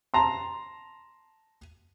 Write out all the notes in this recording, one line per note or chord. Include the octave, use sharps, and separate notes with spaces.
A5 A#5 C6